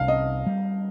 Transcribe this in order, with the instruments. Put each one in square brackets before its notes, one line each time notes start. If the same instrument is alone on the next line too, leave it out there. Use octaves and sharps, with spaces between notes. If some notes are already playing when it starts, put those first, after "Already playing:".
Already playing: [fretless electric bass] C2 [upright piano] F5
[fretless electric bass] C4 [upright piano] D#5
[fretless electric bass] G3